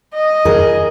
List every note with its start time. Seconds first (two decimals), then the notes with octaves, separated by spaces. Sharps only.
0.14 D#5
0.45 G#4 A#4